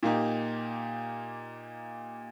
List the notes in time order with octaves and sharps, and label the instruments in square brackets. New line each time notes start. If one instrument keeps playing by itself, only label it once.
[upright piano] A#2 A#3 D#4 G4